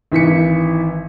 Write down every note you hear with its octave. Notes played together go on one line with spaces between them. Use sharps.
G#1 E3 B6 C#7